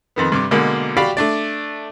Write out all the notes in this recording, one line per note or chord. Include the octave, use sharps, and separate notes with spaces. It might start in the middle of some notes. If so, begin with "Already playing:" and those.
F2 D#3 B3
G2 C3 D6
B2 D3 G#3 A#3
F#4 G4 D5 F5 G5 B5
A3 D4 D5